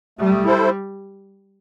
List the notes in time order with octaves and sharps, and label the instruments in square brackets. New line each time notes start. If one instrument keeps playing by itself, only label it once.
[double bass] G3 [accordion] A3
[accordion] E4 A4 C5